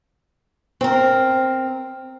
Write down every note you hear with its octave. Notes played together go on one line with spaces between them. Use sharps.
C4 A#4